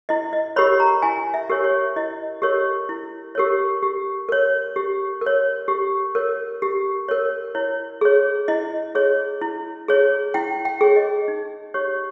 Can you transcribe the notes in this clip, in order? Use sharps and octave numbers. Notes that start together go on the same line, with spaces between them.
E4 D#5
D#5
G4 A#4 C#5 B5
A#5
E4 G#5
E5
G4 A#4 C#5
C#5
E4 D#5
G4 A#4 C#5
E4
G4 A#4 C#5
G4
A#4 C#5
G4
A#4
C#5
G4
A#4 C#5
G4
A#4 C#5
E4 C#5
G#4 C#5
E4 D#5
G#4 C#5
E4
G#4 C#5
E4 G5
G5
G#4 C#5
D#5
D#4
G4 C#5